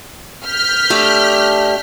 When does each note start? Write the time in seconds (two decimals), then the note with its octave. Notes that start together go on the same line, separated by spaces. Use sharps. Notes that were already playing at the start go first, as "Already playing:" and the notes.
0.46 F6 G6 B6
0.90 A3 D4 G4